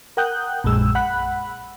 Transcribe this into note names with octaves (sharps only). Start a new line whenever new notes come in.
A#4 F#5 G5 D#6 F#6 G6
A#1 F#2 G#3 E6
F#5 B5 F#6